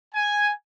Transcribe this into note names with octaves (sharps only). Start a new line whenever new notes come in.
G#5